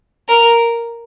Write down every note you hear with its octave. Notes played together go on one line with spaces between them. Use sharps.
A#4